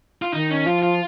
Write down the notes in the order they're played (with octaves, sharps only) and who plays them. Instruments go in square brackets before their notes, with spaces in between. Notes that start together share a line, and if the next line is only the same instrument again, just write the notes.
[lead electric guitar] F4
[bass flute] D#3 [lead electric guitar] D#4
[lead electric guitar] C#4
[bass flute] F3 [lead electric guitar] F4
[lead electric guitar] F4